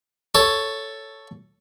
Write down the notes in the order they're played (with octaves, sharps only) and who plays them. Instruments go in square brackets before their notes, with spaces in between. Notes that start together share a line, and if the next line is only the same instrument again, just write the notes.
[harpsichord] A4 C#5